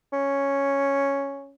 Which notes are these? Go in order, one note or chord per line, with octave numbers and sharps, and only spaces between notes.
C#4